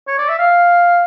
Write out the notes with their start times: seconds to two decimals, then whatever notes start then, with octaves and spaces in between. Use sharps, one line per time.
0.08 C#5
0.18 D5
0.28 E5
0.38 F5